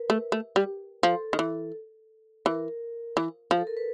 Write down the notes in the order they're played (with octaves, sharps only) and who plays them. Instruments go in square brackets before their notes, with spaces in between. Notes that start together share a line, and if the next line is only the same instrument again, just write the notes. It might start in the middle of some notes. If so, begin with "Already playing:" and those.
Already playing: [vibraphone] A#4 B4
[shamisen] A3
A3
G3
[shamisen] F3 [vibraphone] A4
[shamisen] D#3
E3
[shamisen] E3 [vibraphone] A#4
[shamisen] E3
F3
[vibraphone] A4
A#4
B4